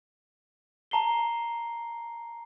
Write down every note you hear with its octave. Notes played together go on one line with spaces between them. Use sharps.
A5 A#5 C7 G7